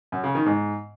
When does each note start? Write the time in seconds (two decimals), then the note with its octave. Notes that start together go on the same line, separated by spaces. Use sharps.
0.12 F#2
0.24 C#3
0.35 D#3
0.46 G#2